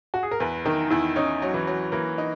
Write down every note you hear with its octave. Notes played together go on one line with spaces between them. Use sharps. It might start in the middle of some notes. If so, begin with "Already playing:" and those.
F#4
G#4
A#4
E2 B4
D#3 A#4
E2 E4
C#4 D#4
F#3
E3
F#3
E3 A#3
D#4